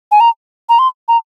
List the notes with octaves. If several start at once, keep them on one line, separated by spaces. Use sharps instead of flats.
G#5
A#5
A#5
C6
A#5